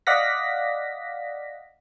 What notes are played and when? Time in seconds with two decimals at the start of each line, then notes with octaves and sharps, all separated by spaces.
0.07 D5 D#5 F5 F#5 A#6 B6